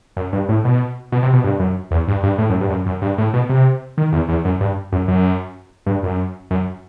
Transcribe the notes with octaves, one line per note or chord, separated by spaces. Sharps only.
F#2
G2
A2
B2
B2
C3
B2
G2
F#2
E2
G2
G2
A2
F#2
G2
F#2
F#2
G2
A2
B2
C3
D#3
E2
E2
F#2
G2
F#2
F#2
G2
F#2
F#2